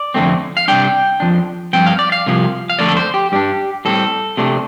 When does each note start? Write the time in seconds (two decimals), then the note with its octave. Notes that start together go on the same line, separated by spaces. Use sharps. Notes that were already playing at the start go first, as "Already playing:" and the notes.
Already playing: D5
0.14 F2 D3 A3 C4
0.57 F5
0.68 C3 G3 D4 G5
1.20 F2 F3 D4
1.73 G2 F3 C4 G5
1.86 F5
1.99 D5
2.12 F5
2.26 C2 C3 F3
2.70 F5
2.79 F2 D3 A3 D5
2.88 A4
2.97 C5
3.14 G4
3.32 G2 G3 D4 G4
3.85 A2 G3 C4 A4
4.37 C3 A3 D4